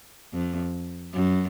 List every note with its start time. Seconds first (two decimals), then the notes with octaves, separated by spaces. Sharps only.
0.33 F2
1.14 F#2